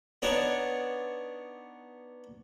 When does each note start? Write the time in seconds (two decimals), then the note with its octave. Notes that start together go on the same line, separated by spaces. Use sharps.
0.22 B3 D4 D#4 C#5 D5